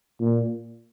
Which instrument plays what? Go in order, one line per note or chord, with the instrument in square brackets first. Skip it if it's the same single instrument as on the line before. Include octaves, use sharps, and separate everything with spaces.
[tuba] A#2